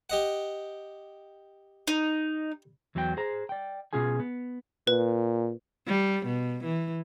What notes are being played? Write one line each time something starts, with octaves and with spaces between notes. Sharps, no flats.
G4 D#5 F#5
D#4
E2 F#3 B3 D#4 G5
G#4 C5 A#5
D5 G5
B2 E3 C#4 F4 G#4 G#5
B3
A#2 B4
G3
B2
E3